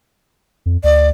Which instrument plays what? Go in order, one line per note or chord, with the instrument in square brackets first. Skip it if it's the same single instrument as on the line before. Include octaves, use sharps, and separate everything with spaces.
[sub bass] F2
[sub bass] D2 [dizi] D5